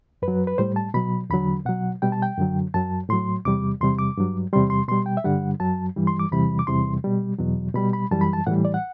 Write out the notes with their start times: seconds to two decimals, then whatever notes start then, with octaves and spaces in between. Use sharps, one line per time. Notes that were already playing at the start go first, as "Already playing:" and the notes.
0.22 F#2 B4
0.28 F#3
0.47 B4
0.58 A2 G3 C5
0.76 A5
0.94 B2 F#3 B5
1.30 E2 D3 F#3 B5
1.65 B2 F#3 F#5
2.02 B2 G3 G5
2.12 A5
2.22 G5
2.37 F#2 D3 F#3
2.74 F#2 F#3 A5
3.09 A2 F#3 C6
3.45 E2 C3 G3 D6
3.81 E2 C3 G3 C6
3.99 D6
4.17 G2 F#3
4.53 E2 C3 G3 C6
4.70 C6
4.88 B2 G3 C6
5.06 G5
5.17 E5
5.24 G2 D3 G3 F#5
5.60 F#2 F#3 A5
5.97 G2 E3 G3
6.07 C6
6.19 D6
6.31 E2 C3 E3 G3 B5
6.59 D6
6.67 E2 C3 E3 G3 C6
7.04 B2 G3
7.39 E2 B2 F#3
7.74 B2 G3 B5
7.93 B5
8.11 F#2 E3 G3 A5
8.21 B5
8.33 A5
8.47 A2 E3 G3 F#5
8.65 D5
8.74 F#5